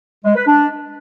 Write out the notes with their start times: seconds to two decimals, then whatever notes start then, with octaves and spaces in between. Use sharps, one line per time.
0.25 G#3
0.36 B4
0.47 D4